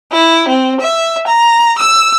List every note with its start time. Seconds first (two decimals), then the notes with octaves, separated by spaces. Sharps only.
0.11 E4
0.48 C4
0.80 E5
1.27 A#5
1.78 E6